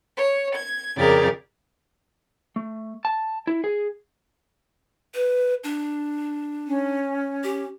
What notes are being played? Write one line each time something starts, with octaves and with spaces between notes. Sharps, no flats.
C#5
G#6
F2 C#3 G4 G#4 A#4 D5
A3
A5
E4
G#4
B4
D4
C#4
G4